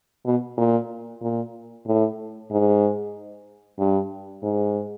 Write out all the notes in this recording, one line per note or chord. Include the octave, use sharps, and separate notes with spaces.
B2
A#2
A#2
A2
G#2
G2
G#2